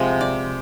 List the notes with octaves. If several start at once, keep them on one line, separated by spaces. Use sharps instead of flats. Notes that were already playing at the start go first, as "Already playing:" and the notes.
Already playing: C3 F3 G#3
D5